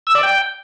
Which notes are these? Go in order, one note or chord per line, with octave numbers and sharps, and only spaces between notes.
E6
D5
G5